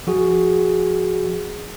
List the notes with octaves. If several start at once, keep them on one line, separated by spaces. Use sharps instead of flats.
F3 F#4 G#4